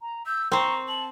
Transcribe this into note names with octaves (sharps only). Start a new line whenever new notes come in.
A#5
E6 G6
C4 C5 A#5 C#6
A5 F#7